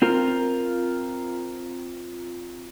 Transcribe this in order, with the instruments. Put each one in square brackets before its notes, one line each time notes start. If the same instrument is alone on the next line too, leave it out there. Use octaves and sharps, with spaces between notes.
[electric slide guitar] C4 F4 A#4